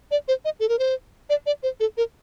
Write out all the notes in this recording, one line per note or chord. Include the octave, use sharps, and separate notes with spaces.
D5
C5
D#5
A4
A#4
C5
D5
D5
C5
A4
A#4